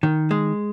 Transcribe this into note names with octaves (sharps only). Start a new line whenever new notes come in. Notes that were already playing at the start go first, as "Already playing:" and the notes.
D#3
G#3